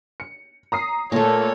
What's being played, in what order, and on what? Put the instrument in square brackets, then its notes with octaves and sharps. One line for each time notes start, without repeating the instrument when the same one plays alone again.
[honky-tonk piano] C#7
A#5 D#6 C7
[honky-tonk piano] A#2 [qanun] A3 A#3 [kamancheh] A4 C#5